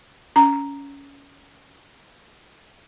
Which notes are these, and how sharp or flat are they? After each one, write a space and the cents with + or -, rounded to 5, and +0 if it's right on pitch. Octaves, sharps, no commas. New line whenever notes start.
C#4 +20 A#5 +0